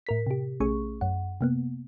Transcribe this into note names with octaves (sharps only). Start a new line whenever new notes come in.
A2 A#4 B6
C3 G4
A#1 A3 C#4 G#4 C#6
F#2 F#5
C3 A#3 B3